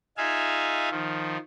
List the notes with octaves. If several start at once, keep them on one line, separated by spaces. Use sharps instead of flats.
D#4 F4 G#4 E5 F5 G#5
D#3 F3